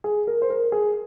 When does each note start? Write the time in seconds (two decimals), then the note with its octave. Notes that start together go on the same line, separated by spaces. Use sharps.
0.04 G#4
0.27 A#4
0.42 C5
0.50 A#4
0.72 G#4